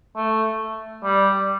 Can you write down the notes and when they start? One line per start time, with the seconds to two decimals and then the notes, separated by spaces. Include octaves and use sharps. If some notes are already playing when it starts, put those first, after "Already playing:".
0.17 A3
1.04 G3